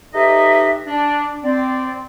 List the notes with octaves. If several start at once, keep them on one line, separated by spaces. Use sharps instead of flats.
D#4 G4 A4 B4 D#5 E5
D4
C4 D5